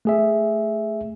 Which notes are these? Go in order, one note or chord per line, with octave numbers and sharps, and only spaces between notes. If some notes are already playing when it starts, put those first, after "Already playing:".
A3 G#4 E5